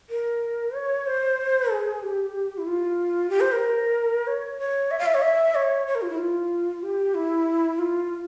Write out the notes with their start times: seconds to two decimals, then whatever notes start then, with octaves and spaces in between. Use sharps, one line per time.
0.10 A#4
0.75 C#5
1.07 C5
1.71 G#4
2.03 G4
2.58 E4
2.67 F4
3.30 G4
3.40 C5
3.52 A#4
4.27 C#5
4.58 C#5
4.91 E5
4.99 F5
5.06 E5
5.14 C#5
5.22 E5
5.55 C#5
5.87 C#5
5.95 A#4
6.02 F4
6.10 E4
6.18 F4
6.83 G4
7.14 E4
7.79 F4